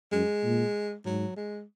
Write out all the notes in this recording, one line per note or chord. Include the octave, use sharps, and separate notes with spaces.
F#2 G#3
A#2
G#2 F#3
G#3